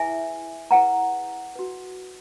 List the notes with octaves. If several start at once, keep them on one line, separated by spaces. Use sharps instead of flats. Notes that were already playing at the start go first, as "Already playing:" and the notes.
Already playing: E4 G#4 B4 E5 G#5
E4 G#4 B4 F#5 A#5
F#4 B4